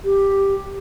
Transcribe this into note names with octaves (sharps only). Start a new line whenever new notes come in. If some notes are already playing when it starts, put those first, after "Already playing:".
G4